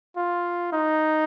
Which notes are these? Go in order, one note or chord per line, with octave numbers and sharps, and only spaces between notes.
F4
D#4